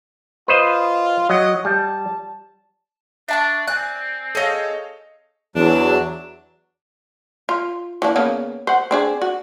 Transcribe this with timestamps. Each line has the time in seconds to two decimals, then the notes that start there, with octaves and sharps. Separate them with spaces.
0.48 F4 B4 C5 D#5
1.29 F#3 D#5
1.65 G3 A5
3.29 D4 E5 A5 C#6
3.68 C4 D5 G#5 F#6
4.35 G#4 A4 C#5 D#5 F5
5.56 E2 F#3 D4
7.49 F4
8.02 E3 A#3 D4
8.16 C#3 A#3 B3
8.67 C5 F#5
8.91 C4 D4 G#4
9.22 F#4